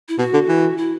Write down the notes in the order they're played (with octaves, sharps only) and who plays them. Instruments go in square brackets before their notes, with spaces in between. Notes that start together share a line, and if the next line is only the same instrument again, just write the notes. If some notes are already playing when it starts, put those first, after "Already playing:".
[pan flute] E4
[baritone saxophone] B2 [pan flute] F#4
[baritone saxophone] D3
E3
[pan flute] E4